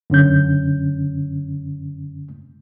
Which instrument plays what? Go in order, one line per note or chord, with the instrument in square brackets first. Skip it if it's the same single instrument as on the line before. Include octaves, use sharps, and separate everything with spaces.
[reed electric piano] F#2 D3 C#4 G6